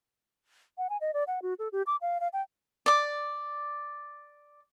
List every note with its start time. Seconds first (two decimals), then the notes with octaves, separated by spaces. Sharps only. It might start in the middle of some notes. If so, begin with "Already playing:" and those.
0.78 F#5
0.90 G#5
1.01 D#5
1.14 D5
1.27 F#5
1.42 F#4
1.59 A4
1.72 G4
1.87 D6
2.01 F5
2.20 F5
2.33 G5
2.86 D5 D6